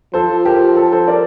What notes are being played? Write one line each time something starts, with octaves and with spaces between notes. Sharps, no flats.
F3 A4 C5
G4 A#4
A4
A4 C5
A#4 D5